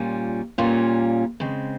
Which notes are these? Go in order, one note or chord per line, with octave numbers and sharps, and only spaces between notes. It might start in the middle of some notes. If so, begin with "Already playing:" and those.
Already playing: A#2 G3 C#4 F4
A#2 G3 C#4 F4
C#3 G#3 C4